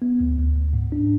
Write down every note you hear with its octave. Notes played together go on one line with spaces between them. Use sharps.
B3
D2
D2
D2
G#2
D4